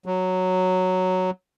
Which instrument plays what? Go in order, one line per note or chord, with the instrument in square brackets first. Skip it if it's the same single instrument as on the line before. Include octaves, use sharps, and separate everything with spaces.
[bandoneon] F#3